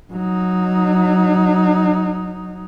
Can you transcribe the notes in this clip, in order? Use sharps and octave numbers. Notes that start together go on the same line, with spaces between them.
F#3 D#4